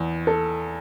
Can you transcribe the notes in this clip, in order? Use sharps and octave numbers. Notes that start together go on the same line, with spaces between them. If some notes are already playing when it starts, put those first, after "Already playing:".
Already playing: E2
A4